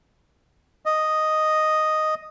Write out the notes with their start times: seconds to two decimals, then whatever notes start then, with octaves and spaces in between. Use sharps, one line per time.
0.86 D#5